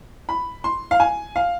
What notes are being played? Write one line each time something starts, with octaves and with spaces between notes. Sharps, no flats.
B5
C6
F5
G#5
F5